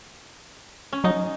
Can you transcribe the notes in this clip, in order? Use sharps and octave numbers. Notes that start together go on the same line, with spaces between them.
C#4
F#3 D#4